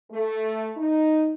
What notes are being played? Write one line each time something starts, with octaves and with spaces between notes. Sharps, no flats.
A3
D#4